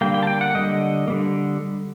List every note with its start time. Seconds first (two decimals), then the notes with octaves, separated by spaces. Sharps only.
0.01 D3 G3 A#3 G5
0.14 G5
0.23 A5
0.27 G5
0.41 F#5
0.55 D3 G3 A#3 D#5
1.08 D3 G3 A#3